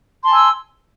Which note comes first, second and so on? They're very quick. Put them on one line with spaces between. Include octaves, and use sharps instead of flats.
C6 A5 G#5 E6